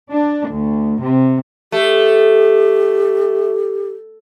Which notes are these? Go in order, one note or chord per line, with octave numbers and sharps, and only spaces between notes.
D4
D2
C3
A3 G4